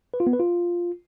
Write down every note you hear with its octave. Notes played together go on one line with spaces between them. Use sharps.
B4
F4
B3
B4
F4